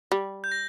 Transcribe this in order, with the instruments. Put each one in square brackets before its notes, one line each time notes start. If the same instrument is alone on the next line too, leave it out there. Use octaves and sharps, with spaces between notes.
[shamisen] G3
[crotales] G6
A#6